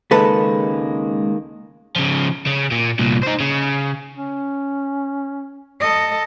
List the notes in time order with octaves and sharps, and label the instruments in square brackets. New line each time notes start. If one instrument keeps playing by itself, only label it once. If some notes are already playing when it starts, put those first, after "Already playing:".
[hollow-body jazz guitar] C#2 A4 B4 [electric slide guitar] D#3 G#3 A#3
[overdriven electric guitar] C#3 F3
C#3
A#2
C2 A#2
D#4 C5
C#3
[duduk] C#4
[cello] A4 D#5